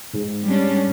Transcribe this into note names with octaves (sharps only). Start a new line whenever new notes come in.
G#2
G3 C#4 D4